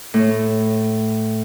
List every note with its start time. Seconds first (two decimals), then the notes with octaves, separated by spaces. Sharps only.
0.14 A2